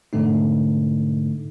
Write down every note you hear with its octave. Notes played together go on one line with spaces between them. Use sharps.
G#2 B2 D3 A3 D#4